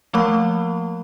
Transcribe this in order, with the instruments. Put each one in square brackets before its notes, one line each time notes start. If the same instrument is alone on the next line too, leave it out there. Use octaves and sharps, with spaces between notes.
[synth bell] F3 A3 A#3 A#4 B5